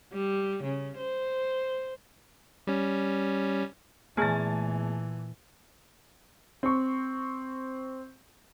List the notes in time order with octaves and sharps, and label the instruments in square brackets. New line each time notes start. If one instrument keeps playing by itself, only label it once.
[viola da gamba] G3
C#3
C5
[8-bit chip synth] G3 C#4
[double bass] A#2 E3 [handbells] A3 B3 G#4 [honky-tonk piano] G#5 A5 A6
[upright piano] C4 C#6